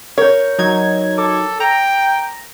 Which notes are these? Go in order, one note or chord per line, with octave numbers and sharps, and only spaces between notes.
A#4 C#5 G6
F#3 D#4 G#6
A4 D6
G5 A#5